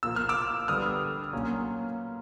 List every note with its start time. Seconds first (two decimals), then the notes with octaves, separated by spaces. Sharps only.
0.03 A#2 F3 A#3 E6
0.16 F6
0.29 D6 E6
0.68 D3 G3 B3 D#6 F6
1.33 A#2 F#3 A#3 C#4